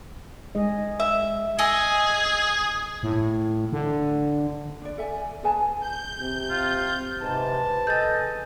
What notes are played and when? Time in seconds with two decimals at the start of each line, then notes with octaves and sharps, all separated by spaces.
0.55 G#3 G#4 D#5
1.00 E5
1.59 G#4 D#5 E5 G#5
3.03 A2
3.72 D3
4.82 D4 D5
4.98 A4 E5 G#5
5.17 D5
5.43 G#4 B4 G#5 A5
5.80 G6
6.20 C3
6.50 F4
7.22 G#2 C3 B4 A5
7.87 G#4 A4 D#5 G6 A6